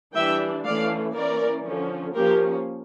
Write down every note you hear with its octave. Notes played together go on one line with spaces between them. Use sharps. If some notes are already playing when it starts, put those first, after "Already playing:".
E3 G3 D4 E5 G5
E3 A3 C#4 D5 F5
E3 A#3 C#4 A#4 D5
D3 F3 C#4
F3 A#3 C#4 G4 A#4